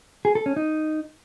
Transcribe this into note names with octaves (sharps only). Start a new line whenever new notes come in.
G#4
A4
C#4
D#4